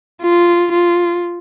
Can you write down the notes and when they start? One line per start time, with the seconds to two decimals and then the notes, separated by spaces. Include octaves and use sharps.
0.22 F4
0.72 F4